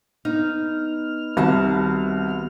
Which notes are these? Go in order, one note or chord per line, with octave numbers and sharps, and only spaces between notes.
B3 D#4 F6
C2 D#3 F#4 A5